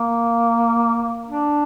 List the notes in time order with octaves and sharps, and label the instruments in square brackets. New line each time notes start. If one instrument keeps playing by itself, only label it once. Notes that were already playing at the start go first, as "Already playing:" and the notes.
Already playing: [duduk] A#3
D4